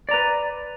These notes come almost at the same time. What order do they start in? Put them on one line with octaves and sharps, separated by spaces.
D5 A#5 B4